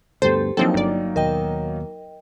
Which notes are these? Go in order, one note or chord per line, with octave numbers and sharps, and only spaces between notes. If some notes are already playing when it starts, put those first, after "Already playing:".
D2 G2 B3 G4 A4 C5
F3 F#3 A#3 C4 D4 D#4 A4 G5
G1 D5
D#2 B2 A#4 D#5 G5